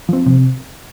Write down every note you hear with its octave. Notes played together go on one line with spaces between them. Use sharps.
F3 C4
C3